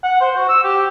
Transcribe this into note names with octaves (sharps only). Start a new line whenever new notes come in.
F#5
C5
F#4
E6
G4